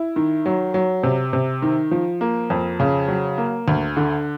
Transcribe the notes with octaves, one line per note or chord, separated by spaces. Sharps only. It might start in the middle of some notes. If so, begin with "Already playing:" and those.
Already playing: E4
D#3
F#3
F#3
C3
C3
D#3
F3
A#3
F2
C#3
F#3
A#3
D2
D3